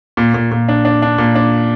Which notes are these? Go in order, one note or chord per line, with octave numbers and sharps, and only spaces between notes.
A#2
A#2
A#2
D4
D4
D4
A#2
D4